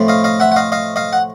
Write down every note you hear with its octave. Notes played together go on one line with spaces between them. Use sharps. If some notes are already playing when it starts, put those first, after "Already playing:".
Already playing: A2 F3 A3 C4
D#5 F5
D#5 F5
E5 F#5
F#5
D#5 F5
D#5 F5
D#5 F5
F#5